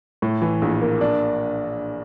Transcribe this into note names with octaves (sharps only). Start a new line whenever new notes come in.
A2
E3
A#1
A#3
D4